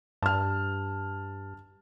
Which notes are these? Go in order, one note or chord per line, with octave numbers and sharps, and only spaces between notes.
G2 A5 F6